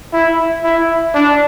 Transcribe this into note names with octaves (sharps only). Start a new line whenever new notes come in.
E4
E4
D4